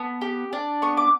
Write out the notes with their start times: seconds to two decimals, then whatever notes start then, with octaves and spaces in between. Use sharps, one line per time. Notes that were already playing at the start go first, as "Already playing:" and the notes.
Already playing: B3 A5
0.21 G4
0.53 D4
0.82 B3 C#6
0.97 D6